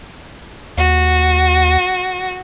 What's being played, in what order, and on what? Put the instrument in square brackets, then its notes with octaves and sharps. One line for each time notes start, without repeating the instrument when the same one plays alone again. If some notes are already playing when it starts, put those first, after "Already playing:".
[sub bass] D#2 [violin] F#4